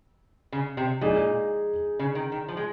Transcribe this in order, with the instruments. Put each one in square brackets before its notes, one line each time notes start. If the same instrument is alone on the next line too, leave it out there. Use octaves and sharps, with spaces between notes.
[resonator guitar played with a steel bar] C#3
C3
[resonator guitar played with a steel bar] A#2 [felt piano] G#3 D#4 G#4
[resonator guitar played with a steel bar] C#3
D#3
D#3
F3
G#3